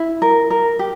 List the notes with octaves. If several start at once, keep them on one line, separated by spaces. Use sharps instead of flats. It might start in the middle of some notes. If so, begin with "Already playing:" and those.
Already playing: E4
A#4
A#4
G4